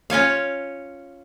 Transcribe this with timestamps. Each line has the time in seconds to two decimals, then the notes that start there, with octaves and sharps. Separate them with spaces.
0.10 C#4 F4 C#5 F5